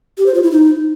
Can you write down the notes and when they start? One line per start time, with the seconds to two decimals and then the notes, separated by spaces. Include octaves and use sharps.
0.18 G4
0.26 C5
0.35 F4
0.43 E4
0.51 D#4